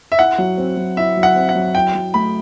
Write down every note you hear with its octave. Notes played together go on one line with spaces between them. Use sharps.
E5
E4 F#5
F#3
C4
F#3
E4 E5
F#3
F#5
C4
F#5
F#3
E4 G5
F#3
A3 B5